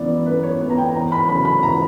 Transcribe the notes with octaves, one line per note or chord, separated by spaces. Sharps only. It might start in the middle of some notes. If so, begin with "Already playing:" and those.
Already playing: F#2 E3 B3 D5
F#2 B4
C#5
E3 B3
A#5
G5
E2 A#5
B5
C#3 F#3 B5
B5
E2 A#5